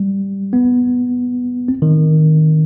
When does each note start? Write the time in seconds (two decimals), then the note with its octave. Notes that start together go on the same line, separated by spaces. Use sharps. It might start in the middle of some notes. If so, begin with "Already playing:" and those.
Already playing: G3
0.53 B3
1.68 C4
1.82 D#3